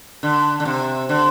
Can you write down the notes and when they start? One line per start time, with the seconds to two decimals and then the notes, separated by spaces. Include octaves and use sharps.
0.23 D3
0.60 D3
0.65 C3
1.09 D3